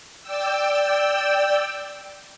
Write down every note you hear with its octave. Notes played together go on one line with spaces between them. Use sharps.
D5 G5 E6